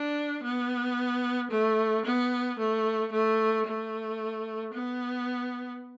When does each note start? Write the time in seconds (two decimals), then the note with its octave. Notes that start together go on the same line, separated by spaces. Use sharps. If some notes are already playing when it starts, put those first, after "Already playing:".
Already playing: D4
0.43 B3
1.50 A3
2.05 B3
2.58 A3
3.12 A3
3.67 A3
4.74 B3